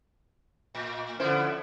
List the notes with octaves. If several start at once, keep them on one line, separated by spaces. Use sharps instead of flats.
A2
D3 F3 B3 C#4 E4 C5